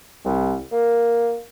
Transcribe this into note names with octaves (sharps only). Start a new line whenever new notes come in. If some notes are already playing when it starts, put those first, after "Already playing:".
C2
A#3